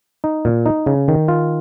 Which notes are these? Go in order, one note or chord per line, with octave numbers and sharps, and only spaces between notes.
D#4
A#2
D#4
C#3
D#3
F4